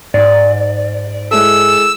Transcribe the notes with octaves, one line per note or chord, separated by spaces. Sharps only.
G#2 D5
G#3 E4 A4 E6